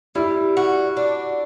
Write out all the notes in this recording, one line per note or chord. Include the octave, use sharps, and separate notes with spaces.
G3 E4
F#4
D4